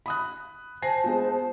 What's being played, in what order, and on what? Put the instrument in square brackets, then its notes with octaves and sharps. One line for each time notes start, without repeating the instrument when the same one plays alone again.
[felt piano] B5 D#6 F#6
[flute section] C5 A5 [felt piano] G#5 A#6 C7
[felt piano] G#3 B3 F4